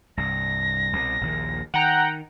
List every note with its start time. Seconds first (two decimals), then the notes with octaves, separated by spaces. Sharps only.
0.17 C2 G2 A#6
0.93 C2 B2
1.21 A#1 D#2 A#2
1.74 D#3 F#5 G5 A#5